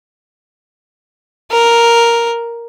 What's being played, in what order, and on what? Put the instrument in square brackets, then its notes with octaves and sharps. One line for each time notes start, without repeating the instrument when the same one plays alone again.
[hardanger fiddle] A#4